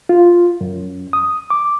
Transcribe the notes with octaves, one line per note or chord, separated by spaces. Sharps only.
F4
F#2
D#6
D6